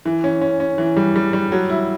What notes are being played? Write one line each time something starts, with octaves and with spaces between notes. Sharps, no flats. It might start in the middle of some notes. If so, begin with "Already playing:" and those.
E3
C#4
C#4
C#4
E3
G3
G3
G3
F#3
E4